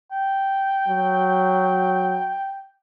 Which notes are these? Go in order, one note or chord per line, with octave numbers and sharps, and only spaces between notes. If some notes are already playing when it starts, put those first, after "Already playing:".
G5
F#3